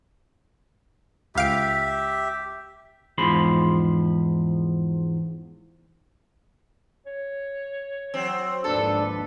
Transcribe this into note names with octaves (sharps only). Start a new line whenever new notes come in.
C#2 G4 E5 F5 D7
E2 G#2 F3 B5 C6
C#5
F#3 C4
G#1 D#2 F3 D4 A4 B4